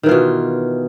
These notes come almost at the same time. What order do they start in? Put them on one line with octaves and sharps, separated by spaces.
D#3 E3 F4 B2